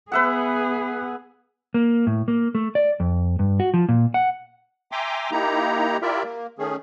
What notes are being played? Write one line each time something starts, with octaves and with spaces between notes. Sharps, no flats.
B3 G#4 B4 E5 F#5
A#3
A2
A#3
A3
D5
F2
G2
F#4
F3
A#2
F#5
E5 G5 G#5 A#5 C6 D6
A#3 D#4 E4 G4 A#5
E4 F4 G4 A#4 D5 E5
A#3
D#3 A3 C#4 G#4